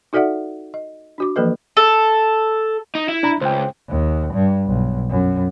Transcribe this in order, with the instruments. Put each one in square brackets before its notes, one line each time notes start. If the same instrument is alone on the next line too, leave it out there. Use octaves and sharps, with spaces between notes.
[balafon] D#4 F#4 A4 D5 E5 F#5
D#5
D4 F#4 D6
E3 F3 A#3 A4 B4 D#5
[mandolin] A4
[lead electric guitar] D#4
E4
[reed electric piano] D4 A#5 B5
[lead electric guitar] C#2 [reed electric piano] C5 G5
[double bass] D#2
G2
B1
F#2